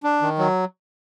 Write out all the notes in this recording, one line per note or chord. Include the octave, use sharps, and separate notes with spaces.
D4
D#3
F#3